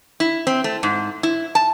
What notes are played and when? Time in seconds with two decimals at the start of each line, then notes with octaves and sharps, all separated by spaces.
0.20 E4
0.47 C4
0.64 A3
0.83 G#2
1.23 E4
1.55 A5